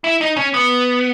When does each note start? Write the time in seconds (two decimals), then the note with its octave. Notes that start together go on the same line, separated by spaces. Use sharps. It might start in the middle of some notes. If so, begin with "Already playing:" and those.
0.04 E4
0.21 D#4
0.37 C#4
0.54 B3